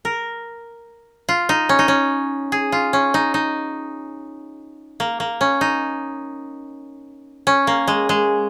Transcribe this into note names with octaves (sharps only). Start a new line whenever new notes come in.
A#4
F4
D#4
C#4
D#4
C#4
G#4
F4
C#4
D#4
D#4
A#3
A#3
C#4
D#4
C#4
A#3
G#3
G#3